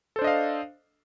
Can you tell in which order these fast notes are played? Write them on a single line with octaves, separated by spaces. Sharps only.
A4 C5 D4 D#5 F5